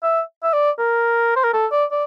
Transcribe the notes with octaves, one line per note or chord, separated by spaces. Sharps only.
E5
E5
D5
A#4
C5
A#4
A4
D5
D5